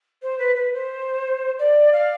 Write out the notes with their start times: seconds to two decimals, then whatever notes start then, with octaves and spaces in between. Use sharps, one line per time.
0.22 C5
0.39 B4
0.56 B4
0.73 C5
1.59 D5
1.93 F5